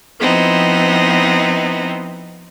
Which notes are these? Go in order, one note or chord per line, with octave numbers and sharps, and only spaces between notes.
F3 B3 C4 D#4 E4